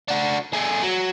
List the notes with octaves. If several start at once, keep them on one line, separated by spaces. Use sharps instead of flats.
D4 F#4
A3 G#4
F#3